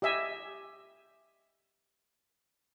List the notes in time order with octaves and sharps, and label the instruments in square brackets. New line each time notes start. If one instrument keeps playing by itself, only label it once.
[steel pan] G4 D#5 E5 G#5